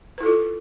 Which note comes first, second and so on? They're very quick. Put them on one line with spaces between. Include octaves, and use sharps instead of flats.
B4 E4 A4 F4